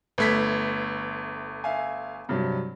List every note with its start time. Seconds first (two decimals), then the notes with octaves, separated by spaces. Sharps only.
0.18 G1 A3 B4 G#6 B6
1.64 E5 F5 G#5
2.29 G2 C3 F#3